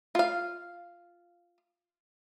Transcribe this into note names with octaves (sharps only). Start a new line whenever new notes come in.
F4 F5